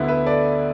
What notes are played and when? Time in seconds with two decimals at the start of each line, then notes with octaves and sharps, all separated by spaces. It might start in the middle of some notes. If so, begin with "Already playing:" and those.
Already playing: D2 D3 B3 E4
0.08 B4 E5
0.26 A4 D5